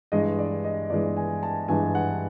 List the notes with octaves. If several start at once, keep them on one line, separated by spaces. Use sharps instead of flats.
G2 E3 G#3 D#5
D5
D#5
G2 E3 G#3 D5
G#5
A5
G2 E3 G#3 G#5
F#5